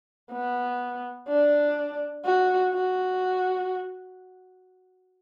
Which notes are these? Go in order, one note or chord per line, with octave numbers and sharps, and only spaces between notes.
B3
D4
F#4
F#4